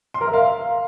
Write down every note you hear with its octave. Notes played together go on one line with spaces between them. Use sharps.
C6
A#4
E5
F5